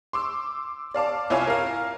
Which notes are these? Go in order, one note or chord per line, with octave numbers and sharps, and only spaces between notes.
C6 D6 E6
D5 F5 A5 D6
C2 E4 F4 C#5 F5 G#5
A#4 F5